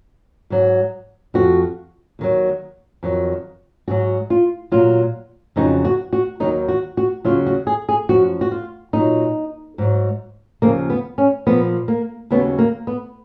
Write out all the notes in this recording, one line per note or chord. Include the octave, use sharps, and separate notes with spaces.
G#2 F#3
F2 F3 F#4
D#2 D#3 F#3
F2 D#3 F#3
G#2 F#3 F#4
F4
A#2 F#3 F4
F2 C#3 F#3 D#4
F#4
F#4
D#2 D#3 F#3 D#4
F#4
F#4
D#2 C#3 F#3 F4
F#4
G#4
G#4
F#2 F3 F#4
F#4
F4
A#2 F#3 D#4
G#2 F#3
D#2 C#3 F3 A#3
B3
C#4
A#2 F3 B3
A#3
D#2 C#3 F#3 B3
A#3
B3